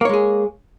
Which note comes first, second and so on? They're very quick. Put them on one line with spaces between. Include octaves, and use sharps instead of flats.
A#3 C#5 G#3 G#4